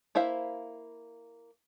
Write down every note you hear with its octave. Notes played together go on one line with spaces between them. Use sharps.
A#3 E4 C5 E5 F5